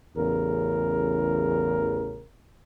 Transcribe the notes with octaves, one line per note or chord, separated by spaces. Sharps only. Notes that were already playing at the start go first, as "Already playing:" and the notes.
A1 E2 C#3 A#4